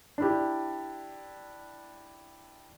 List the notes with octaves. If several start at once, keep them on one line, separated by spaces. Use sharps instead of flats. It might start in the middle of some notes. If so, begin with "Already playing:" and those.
D4 E4 G4